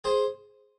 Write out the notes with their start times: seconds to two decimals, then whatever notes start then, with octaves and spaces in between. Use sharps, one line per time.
0.04 G#4 C5